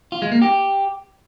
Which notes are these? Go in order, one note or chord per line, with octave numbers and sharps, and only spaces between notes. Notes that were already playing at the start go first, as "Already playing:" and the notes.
F4
G#3
A#3
G4